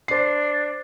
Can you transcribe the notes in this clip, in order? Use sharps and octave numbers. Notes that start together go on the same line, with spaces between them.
D4 C5 C7